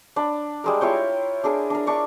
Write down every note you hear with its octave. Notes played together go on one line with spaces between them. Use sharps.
D4 B5
G3 G#3 A#4
E4 F4 C#5 G5
D4 G#4 A#4
D4 A#4
D4 C#6 D6